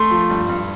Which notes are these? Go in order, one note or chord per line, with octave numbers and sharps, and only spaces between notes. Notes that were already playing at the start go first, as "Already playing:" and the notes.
Already playing: A3 C6
F3
G2
G2